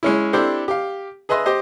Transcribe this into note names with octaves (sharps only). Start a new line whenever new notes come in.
G#3 C#4 E4
C4 D4 E4 G4 A4 C5
G4 F5
G#4 B4 D#5 E5 C6
G4 C5 D#5